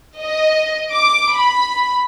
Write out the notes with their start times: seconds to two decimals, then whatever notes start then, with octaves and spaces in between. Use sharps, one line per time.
0.21 D#5
0.92 D6
1.35 B5